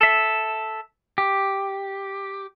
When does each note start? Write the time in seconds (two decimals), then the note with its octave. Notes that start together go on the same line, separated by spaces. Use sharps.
0.01 A4 E5
1.18 G4